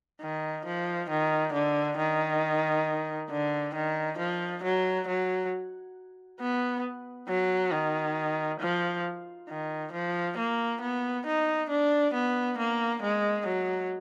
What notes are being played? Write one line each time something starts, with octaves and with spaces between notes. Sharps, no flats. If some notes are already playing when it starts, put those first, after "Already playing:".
D#3
F3
D#3
D3
D#3
D3
D#3
F3
F#3
F#3
B3
F#3
D#3
F3
D#3
F3
A#3
B3
D#4
D4
B3
A#3
G#3
F#3